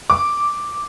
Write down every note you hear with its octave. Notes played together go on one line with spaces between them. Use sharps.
D6